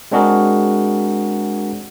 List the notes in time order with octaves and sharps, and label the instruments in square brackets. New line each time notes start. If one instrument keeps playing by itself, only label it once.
[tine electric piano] G#3 C4 D4 F#4 G#4 A#4